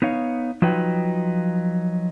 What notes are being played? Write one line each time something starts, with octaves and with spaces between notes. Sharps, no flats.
B3 D#4 C#5 F5
F3 F#3 D#4 B4 G5